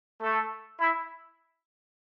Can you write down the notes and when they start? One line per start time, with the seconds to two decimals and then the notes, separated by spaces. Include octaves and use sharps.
0.21 A3 A4
0.80 E4